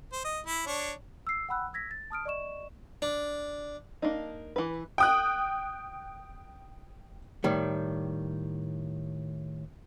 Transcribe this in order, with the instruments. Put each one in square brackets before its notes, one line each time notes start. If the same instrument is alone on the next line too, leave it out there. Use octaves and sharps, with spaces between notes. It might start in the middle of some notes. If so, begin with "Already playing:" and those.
[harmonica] C5
D#5
E4
D4 C#5
[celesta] E6 C7
F#5 G5 B5 E6 F#6
E6 G#6 A#6 B6
A6
A5 D#6 F6 D7
D5 D#5 C#6 E7
[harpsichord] D4
[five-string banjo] A#3 D4 D#4
E3 B4
[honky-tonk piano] G5 D#6 F#6
[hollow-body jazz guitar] A2 D#3 G3